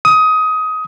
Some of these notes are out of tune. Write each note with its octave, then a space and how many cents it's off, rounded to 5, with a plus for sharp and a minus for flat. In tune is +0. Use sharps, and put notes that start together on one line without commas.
D#6 +20